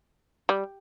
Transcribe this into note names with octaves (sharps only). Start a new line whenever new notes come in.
G3